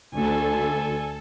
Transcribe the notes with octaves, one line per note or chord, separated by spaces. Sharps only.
D2 A4 G#5